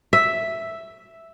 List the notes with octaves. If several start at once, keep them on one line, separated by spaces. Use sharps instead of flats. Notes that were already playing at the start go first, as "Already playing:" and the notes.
E5